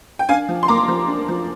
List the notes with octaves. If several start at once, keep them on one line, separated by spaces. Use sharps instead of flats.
G5
D4 F5 G#5
F3
C6
A#3 A#5 D6
F3
D4
F3